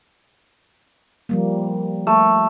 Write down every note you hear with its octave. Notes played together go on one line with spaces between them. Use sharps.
F3 G3 A#3
A3